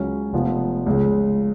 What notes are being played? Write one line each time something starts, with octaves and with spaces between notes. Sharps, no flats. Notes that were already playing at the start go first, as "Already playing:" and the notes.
Already playing: C#2 C#3 F#3 C#4
F1 F2 F3 B3
C#2 C#3 G#3